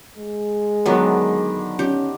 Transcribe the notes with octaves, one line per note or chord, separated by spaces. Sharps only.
G#3
D3 D#3 F#3 G3 B3
C#4 G4